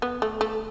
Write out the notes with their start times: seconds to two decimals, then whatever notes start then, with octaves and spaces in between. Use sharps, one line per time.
0.02 B3
0.22 A3
0.41 A3